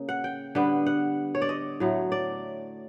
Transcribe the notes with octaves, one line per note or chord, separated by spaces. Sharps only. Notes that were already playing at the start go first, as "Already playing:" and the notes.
Already playing: C#3 A#3
F#5
G5
D3 G3 B3
F#5
C#5
D5
D#5
A2 F#3 A3
D5